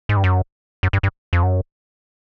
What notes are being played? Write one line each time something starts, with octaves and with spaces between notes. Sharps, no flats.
G#2
G2
F#2
F#2
G2
G2
F2
F#2